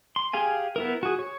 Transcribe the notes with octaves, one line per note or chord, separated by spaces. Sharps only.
C6
G4 G#4 F5 G#5
B3 E4 A#4
F#4 G#4
C#5